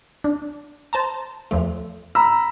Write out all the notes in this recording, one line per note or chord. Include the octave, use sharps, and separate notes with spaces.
D4
C5 A5 A#5
E2 F3 A3
A#5 B5 E6